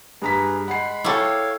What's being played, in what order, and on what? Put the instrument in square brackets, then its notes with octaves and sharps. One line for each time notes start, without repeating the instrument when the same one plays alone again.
[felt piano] G2 A#5 B6 [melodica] G#4 B4
[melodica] G#3 B5 [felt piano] F#5 C7
[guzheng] E4 A4 [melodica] C#5 F5 [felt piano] G5 C#6 D6